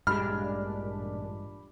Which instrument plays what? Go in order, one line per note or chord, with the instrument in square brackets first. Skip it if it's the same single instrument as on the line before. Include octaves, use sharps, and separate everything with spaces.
[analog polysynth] A1 A#2 D4 [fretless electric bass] G2 G#3 [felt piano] G4 B5 [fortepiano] F6